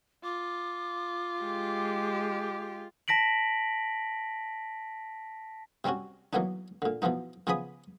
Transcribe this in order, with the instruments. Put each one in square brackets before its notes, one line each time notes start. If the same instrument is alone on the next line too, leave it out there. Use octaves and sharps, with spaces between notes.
[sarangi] F4 [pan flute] D6
[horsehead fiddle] G#3 G4
[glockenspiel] A5 A#6 B6 D7 F#7
[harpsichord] C3 G3 C4 C#4 F#4
E3 F#3 A#3 B3 D4 D#4
A#2 D3
B2 E3 F3 B3 D#4
C#3 F3 B3 G#4 B5 D#6